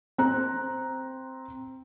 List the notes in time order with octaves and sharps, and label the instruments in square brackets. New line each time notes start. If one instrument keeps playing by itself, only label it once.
[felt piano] C4 A#5 F#6